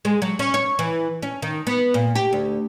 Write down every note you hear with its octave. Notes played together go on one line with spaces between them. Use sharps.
G#3
F#3
C#4
C#5
E3
C#4
D#3
B3
A#2
G4
D2